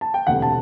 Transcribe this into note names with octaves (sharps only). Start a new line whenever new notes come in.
A5
G5
E1 D2 C3 F#5
A5